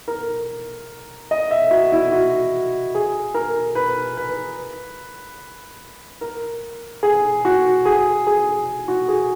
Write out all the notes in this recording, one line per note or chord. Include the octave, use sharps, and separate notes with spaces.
A#4
D#5
E5
F#4
E4
F#4
G#4
A#4
B4
B4
A#4
G#4
F#4
G#4
G#4
F#4
G#4